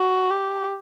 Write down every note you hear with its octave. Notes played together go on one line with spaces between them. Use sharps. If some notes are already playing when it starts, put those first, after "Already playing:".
Already playing: F#4
G4